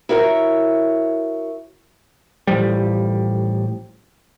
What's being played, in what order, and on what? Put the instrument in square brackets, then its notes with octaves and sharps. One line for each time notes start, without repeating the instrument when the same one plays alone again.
[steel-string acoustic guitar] E4 F#4 A#4 C#5 E5
[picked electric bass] A1 A2 F3 G3